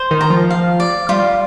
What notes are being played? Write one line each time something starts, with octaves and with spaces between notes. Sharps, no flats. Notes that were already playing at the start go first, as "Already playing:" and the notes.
Already playing: C5
D#3
A#5
F3
F5
D5
G3 F4